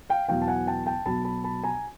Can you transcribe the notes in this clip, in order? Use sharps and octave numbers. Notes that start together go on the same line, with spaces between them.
F5 G5
E2 B2 F#3 F5 G5
A5
F#5 G#5
G5 A5
G5 A5
B1 B2 F#3 A5 B5
A5 B5
A5 B5
G#5 A#5